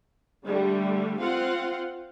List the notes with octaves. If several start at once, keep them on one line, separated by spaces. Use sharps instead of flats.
D3 G3 A3
C4 F4 F5 F#5 C6